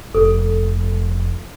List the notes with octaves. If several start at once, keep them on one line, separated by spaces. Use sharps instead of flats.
F1 A4